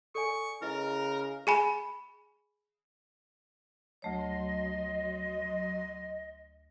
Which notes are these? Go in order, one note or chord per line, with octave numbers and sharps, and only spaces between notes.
A4 D5 G#5 C#6
C#3 E4 A#4 B4 D#5
G#4 G#5 B5
D2 F#3 A3 C#5 D#5 C6